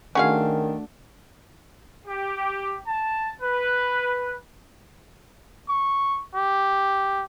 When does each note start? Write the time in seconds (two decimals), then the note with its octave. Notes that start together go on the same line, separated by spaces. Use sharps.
0.15 D#3 A3 C#4 D4 F#4 G#4 F5 F#5
2.06 G4
2.87 A5
3.41 B4
5.69 C#6
6.35 G4